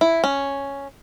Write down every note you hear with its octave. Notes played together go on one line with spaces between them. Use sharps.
E4
C#4